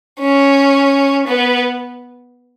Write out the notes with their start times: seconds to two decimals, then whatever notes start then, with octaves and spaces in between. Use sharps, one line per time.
0.20 C#4
1.27 B3